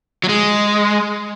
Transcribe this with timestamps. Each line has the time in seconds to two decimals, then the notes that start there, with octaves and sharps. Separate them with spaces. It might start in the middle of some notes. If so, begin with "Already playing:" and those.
0.24 F#3
0.29 G#3